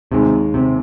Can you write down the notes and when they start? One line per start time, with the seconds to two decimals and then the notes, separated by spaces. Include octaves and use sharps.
0.12 D#2 C3 D#3 G#3
0.54 C3